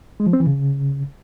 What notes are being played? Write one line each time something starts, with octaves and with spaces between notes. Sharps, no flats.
G#3
F3
C4
E3
C#3